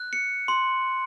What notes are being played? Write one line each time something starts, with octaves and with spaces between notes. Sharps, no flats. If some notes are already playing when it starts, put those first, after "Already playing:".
Already playing: F#6
C#7
C6